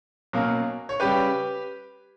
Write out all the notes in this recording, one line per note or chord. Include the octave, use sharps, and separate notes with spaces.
B2 F#3 A#3 C#4
C#5
C#3 G3 C#4 G4 B4